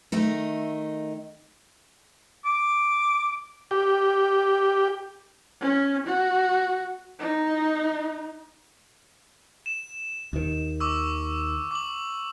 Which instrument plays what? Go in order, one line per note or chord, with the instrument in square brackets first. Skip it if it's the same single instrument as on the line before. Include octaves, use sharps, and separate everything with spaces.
[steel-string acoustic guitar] D#3 A3 D#4
[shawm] D6
[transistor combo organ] G4
[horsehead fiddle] C#4
F#4
D#4
[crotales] E7
[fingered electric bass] D#2 D#3
[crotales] C#6 D6 E6
D6 F#7